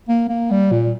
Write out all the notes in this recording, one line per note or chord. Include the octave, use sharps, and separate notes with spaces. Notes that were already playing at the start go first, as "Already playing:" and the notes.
A#3
A#3
G3
A#2